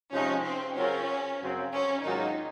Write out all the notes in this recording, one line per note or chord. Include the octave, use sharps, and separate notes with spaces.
C3 F3 G#3 C#4 D#4
C4
C#3 F#3 C4 C#4 F4 A#4
F#2 C#3 F#3 C4
C#4
G#2 D#3 F#3 A#3 D#4 F4